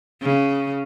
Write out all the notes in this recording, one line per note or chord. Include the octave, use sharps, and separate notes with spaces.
C#3